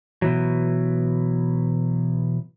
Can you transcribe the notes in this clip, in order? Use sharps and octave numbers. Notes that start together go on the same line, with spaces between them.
B2 E3 F#3